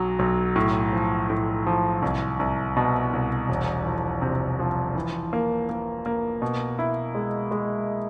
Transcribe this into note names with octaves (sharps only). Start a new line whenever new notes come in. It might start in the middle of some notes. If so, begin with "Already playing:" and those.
Already playing: B1 F#3
B1
A2
F3
A2
F3
C2
C2
B2
C2
E1
F3
C3
F3
E3
A#3
A#3
A#3
B2
E4
G#3
G#3